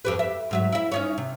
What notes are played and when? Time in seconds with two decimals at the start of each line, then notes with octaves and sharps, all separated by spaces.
0.05 F2 G4 B4
0.19 E5
0.51 G#2 F#3 E5
0.72 E4 E5
0.92 C#4 D#4 C#5
1.18 C3